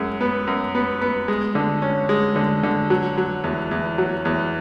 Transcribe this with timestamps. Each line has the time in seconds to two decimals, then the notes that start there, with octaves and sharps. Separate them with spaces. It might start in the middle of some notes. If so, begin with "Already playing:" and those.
Already playing: F#2 G#3
0.21 B3
0.47 F#2
0.75 B3
1.01 B3
1.28 G#3
1.55 D3
1.82 C#4
2.09 G#3
2.36 D3
2.63 D3
2.90 F#3
3.18 F#3
3.44 E2
3.71 E2
3.98 F#3
4.25 E2